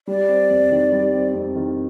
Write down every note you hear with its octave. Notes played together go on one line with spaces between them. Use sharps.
G3 D5
C4
F2
D#3
G3
C4
F2
D#3